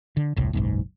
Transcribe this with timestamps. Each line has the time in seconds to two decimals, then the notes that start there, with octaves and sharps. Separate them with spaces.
0.17 D3
0.37 E1 C2 A2
0.53 F#1 B1 G#2